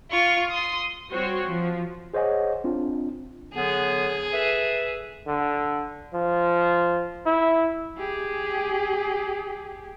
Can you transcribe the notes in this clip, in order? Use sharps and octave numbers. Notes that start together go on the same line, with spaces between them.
F4 C#6
C6 D#6
G3 C4 F#4 C5 C#5 C6
F3
G#4 C5 C#5 D#5 F#5 G#5
C4 D4 F4
D3 F#3 B3 G#4
A4 B4 E5
D3
F3
E4
G4 G#4